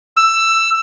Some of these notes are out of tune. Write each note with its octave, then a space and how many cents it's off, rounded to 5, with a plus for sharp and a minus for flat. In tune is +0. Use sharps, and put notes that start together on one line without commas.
E6 +10